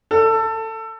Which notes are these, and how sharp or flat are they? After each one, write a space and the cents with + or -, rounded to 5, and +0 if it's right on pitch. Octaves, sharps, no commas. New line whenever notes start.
A4 +20